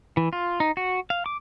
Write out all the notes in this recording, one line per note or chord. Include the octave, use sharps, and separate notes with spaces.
E3
F4
D#4
F#4
F5
D6